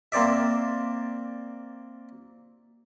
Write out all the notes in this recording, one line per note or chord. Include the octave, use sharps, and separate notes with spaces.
A#3 C4 C5 D5 E5